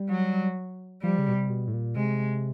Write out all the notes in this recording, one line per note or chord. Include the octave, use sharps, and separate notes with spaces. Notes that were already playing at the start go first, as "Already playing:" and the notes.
Already playing: G3
F#3
F3 G3
C#3
B2
C3
B2
A2
A#2
C3 G#3